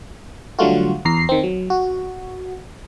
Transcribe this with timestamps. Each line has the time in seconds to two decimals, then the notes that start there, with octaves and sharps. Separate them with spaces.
0.59 D3 F#3 G3 A3 F4 F#4
1.05 E2 A#5 C7
1.29 D#3 C4
1.43 F#3
1.70 F#4